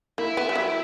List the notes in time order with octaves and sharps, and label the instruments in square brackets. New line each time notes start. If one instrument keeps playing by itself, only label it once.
[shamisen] A#3 [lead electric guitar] E4
[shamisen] B3
G3
F#3